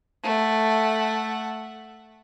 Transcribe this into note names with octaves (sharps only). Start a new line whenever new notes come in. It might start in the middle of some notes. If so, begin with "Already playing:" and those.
A3 F#5